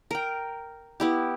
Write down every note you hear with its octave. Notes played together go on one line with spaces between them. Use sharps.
A#4 G5
B3 E4 G4